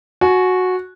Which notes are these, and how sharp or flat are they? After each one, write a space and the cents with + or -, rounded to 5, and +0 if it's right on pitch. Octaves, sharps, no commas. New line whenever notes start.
F#4 -10 G#5 +30